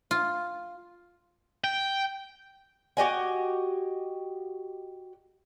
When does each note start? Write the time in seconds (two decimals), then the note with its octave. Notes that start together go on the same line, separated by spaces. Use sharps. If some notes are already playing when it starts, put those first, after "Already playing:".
0.11 F4
1.64 G5
2.97 F#4 G4 D#5 G#5